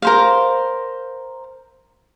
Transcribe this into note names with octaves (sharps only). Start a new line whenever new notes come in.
A#4 C5 F5